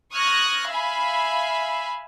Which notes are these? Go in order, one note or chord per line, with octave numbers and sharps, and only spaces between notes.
C#6 D#6 F6 F#6 G#6 A#6
E5 F5 G#5 B5